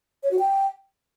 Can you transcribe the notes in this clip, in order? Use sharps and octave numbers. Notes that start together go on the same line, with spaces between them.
C#5
F#4
G5